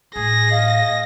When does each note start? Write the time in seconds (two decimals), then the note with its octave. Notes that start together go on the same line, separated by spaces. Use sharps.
0.16 A2 G#4 A#6
0.51 D#5 F5